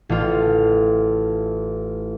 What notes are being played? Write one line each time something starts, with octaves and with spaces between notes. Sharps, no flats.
A1 F4